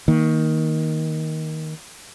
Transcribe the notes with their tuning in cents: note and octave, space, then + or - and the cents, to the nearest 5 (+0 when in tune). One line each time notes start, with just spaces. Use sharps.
D#3 +15 A#3 +0